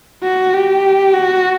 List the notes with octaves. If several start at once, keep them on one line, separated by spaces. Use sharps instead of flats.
F#4
G4
F#4